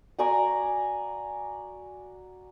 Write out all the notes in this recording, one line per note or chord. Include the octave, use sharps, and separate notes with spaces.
F#4 D5 G#5 A#5